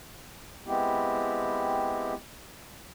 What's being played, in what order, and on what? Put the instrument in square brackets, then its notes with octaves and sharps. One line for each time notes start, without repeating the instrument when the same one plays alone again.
[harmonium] G#3 B3 C4 E4 G4